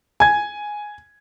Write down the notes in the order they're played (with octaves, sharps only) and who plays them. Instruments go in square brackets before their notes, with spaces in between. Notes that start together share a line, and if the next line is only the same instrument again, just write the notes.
[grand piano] G#5 G#6